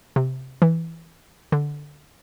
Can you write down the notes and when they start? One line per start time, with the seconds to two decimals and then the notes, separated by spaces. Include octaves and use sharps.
0.16 C3
0.62 E3
1.52 D3